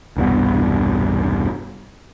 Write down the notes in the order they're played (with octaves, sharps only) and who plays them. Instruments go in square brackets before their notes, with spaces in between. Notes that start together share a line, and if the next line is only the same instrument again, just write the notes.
[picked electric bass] E1 C2 G2 B3